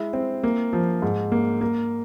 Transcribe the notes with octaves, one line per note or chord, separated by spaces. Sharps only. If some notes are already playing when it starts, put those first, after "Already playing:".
Already playing: G#3 E4
C4
A#3
F3
G#2
A#3
A#3